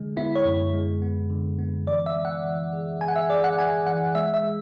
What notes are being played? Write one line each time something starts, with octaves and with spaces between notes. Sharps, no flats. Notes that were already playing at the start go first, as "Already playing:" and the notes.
Already playing: D3 G#3
B3 E4
C#5
F#2
G#3
B3
D3
B3
E3 D5
E5
G#3
F#5
E3
G#4
G#4 G#5
F#5
E5
G#4 D5
F#5
G#4 G#5
E3 F#5
G#3 E5
E5
G#3